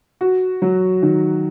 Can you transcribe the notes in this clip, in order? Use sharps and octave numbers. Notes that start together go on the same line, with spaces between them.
F#4
F#3
D#3